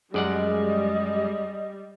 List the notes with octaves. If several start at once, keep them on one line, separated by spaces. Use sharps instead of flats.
F#2 G3 G#3 D5 D#5 F#5